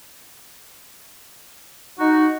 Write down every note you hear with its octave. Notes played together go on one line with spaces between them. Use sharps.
D#4 F#4